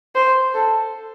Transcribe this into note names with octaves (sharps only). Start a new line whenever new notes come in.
C5
A4